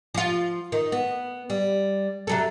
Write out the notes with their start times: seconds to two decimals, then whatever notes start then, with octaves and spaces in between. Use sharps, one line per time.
0.14 F3 F4
0.72 D#3
0.92 B3
1.50 G3
2.27 C3 F#3 A4